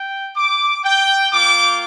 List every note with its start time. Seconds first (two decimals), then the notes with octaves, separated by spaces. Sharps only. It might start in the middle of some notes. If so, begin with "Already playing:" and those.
Already playing: G5
0.37 D6
0.84 G5
1.33 A#3 F4 D6